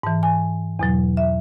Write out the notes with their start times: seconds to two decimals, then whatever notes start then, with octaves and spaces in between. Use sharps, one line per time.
0.03 G#2 E3 A5
0.23 G#5
0.79 E2 B2 F#3
1.17 E5